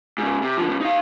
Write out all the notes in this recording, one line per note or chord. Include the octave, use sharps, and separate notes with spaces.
G#2 C#3
C3
D3 F3
G#2 C#3
D#4 F5